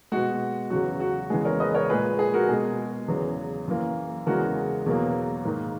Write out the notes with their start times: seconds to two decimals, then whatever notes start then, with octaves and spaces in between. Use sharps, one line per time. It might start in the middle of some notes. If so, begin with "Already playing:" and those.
0.12 B2 G#3 F#4
0.70 E2 C#3 F#3 F#4
1.00 F#4
1.30 E2 C#3 E3 G#3 G#4
1.45 A#4 C#5
1.60 B4 D#5
1.75 A#4 C#5
1.90 A#2 G#3 G#4 B4
2.19 G#4
2.34 F#4 A#4
2.49 B2 G#3 G#4
3.08 E2 C#3 F#3
3.68 F#2 E3 A#3
4.26 E2 C#3 E3 G#3 F#4 A#4
4.86 E2 B2 F#3 A#3
5.45 G#2 D#3 A#3